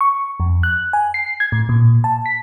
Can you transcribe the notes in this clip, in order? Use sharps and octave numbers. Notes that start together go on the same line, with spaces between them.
C#6
F2
F#6
G#5
C7
G#6
A2
A#2
A5
B6